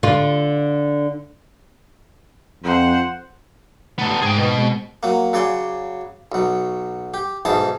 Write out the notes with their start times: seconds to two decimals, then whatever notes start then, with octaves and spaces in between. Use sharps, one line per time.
0.03 D3 F4
2.63 F2 C5 F#5
3.99 A3 B3 A4 A5
4.22 G#2 G#4 G5
4.37 B2
4.57 G#3 C4
5.03 F#3 A#3
5.33 C#3 F#3 D5 G#5 C6
6.32 B1 F#3
7.14 G4
7.45 B1 G#2 E3 G#4 A5